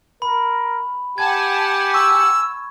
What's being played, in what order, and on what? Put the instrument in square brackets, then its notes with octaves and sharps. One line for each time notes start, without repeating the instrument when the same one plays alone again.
[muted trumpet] A#4 [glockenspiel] B5
[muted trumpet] G4 [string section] F#5 G#5 A5 [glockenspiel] G#6
[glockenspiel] C#6 [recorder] E6